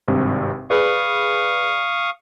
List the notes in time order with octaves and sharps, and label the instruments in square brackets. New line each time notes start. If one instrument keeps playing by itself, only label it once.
[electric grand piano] G#1 G2 C3
[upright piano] G#4 B4 [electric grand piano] D5 B5 [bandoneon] F5 C#6 D#6